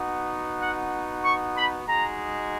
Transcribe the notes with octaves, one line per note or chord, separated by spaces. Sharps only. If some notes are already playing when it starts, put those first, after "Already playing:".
Already playing: B3 D#4 F#4
F#5
C#6
B5
G#3 D#4 F#4 A#5